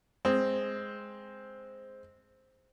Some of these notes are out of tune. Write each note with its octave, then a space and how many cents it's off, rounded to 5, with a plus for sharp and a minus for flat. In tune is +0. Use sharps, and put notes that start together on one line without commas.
G#3 +0 C4 +0